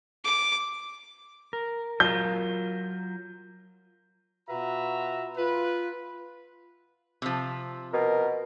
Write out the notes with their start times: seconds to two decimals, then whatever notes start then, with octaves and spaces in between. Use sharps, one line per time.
0.25 D6
1.53 A#4
2.00 F#3 F4 A#4 G6
4.49 B2 F4 F#4 B4 E5 A#5
5.37 F4 B4
7.22 C3 F3
7.93 B2 A#4